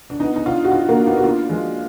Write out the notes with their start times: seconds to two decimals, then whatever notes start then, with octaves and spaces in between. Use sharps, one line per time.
0.10 D4
0.19 B3 D#4
0.36 D#4
0.46 D4 F4
0.64 F#4
0.71 D4 F4
0.89 A#3 D4
1.06 B3 D#4
1.17 F#4
1.24 D4 F4
1.49 F3 G#3